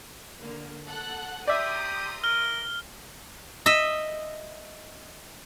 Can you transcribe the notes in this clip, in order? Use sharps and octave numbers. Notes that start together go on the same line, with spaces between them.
D3 A#3
A4 F#5 F#6
G4 D5 E5 A#5 C6 D#6
A#4 F6 G7
D#5 E5